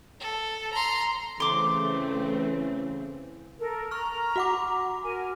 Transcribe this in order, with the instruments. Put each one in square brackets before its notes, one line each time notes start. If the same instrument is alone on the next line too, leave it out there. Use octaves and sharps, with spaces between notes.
[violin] A4
A#5 C6
[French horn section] C#3 E3 [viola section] A3 C4 [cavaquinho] C6 D6
[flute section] A4 A#4
[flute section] A#5 [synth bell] C#6 F6
[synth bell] F#4 F#5 D6
[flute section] A#4 G#5